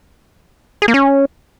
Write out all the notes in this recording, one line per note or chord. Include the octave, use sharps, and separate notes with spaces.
G#4
A#3
C#4